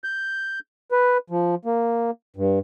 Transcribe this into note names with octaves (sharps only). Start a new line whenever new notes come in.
G6
B4
F3
A#3
G2